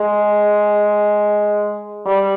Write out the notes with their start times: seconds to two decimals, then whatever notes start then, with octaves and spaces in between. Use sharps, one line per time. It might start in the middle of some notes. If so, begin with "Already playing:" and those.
Already playing: G#3
2.06 G3